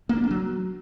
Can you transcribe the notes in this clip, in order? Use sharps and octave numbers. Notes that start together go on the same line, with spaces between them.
A#3
D4
A#3
F#3